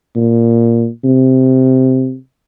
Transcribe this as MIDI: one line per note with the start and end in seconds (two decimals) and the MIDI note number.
0.16 0.88 46
1.04 2.16 48